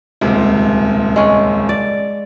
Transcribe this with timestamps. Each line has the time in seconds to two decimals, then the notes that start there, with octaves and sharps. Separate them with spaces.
0.21 D#1 C#2 C3
1.16 G#3 C#4
1.69 D5